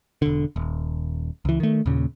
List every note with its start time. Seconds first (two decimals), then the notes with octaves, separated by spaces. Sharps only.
0.22 E1 D3
0.56 D#1
1.45 C#2 E3
1.60 D#3 A3
1.86 D#2 A#2 C#3